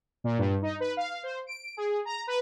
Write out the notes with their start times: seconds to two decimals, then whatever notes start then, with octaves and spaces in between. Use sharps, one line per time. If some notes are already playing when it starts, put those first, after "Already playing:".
0.24 A#2
0.38 G2
0.62 D#4
0.80 B4
0.97 F5
1.23 C5
1.47 D7
1.77 G#4
2.05 A#5
2.27 B4